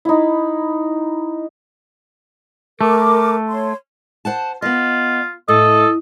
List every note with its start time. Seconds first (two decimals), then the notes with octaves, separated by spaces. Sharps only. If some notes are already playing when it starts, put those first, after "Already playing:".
0.05 D#4 E4
2.81 A3 A#4 D6
3.49 C#5 C6
4.25 C5 F#5 A5
4.62 B3 F4 D#5
5.48 A2 A4 D#5